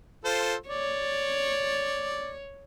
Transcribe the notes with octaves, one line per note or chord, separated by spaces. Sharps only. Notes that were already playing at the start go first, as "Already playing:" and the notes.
F4 A4 C5
C#5 D5